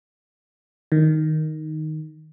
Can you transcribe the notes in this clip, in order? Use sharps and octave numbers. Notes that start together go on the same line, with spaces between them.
D#3